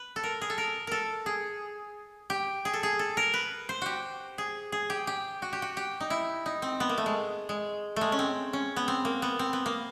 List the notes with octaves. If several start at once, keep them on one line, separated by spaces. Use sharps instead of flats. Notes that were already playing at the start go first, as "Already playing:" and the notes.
Already playing: B4
A4
A#4
G#4
A4
A#4
A4 A#4
G#4
G4
G#4
A4
G#4
A4
A#4
B4
C5
F#4 G4
G#4
G#4
G4
G4
F#4
G4
F#4
G4
D#4
E4
D#4
C4
B3
A#3
A3
G#3
G#3
G#3 A3
C#4
C4
C#4
B3
C4
A#3
B3
C4
B3
A#3